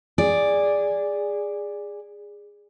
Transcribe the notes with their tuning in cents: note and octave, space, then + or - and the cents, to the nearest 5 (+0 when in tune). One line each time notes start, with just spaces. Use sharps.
G#4 -15 D5 +0